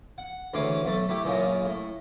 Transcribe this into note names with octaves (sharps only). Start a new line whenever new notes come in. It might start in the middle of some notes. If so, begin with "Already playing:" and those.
F#5
D2 C#3 E3 C#4 C6 D6
B1 A3 A5
A3 E4 G4
C#2 F#2 A#2 C#3 A#3
A2